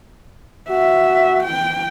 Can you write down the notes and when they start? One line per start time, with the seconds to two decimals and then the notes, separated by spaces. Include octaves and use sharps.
0.70 F#4 E5
1.44 G5